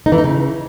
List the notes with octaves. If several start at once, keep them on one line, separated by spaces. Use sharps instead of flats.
D#4
E3
D#4
C#3